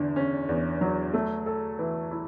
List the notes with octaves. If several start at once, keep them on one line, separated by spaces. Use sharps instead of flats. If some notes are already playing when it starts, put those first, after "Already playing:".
Already playing: E2 D3
C#4
E2
F#3
A3
A4
E3
E4